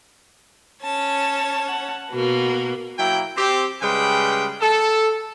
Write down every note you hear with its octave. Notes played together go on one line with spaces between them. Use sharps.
C#4 C#5 A5
F#5
B2 A#3 B3 F#4
F#3 A#3 E4 G5
C4 G4
C#3 G3 G#3 B4 G5
A4